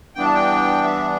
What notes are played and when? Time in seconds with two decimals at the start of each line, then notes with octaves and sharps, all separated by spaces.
0.15 G2 E3 B3 D4 G5
0.25 A5
0.35 G5
0.83 E5